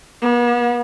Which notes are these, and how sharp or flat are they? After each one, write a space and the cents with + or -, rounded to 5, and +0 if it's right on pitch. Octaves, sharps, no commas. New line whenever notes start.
B3 -40